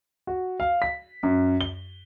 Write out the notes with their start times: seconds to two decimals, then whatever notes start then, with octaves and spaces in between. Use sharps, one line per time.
0.27 F#4
0.60 F5
0.82 B6
1.23 F#2
1.61 G7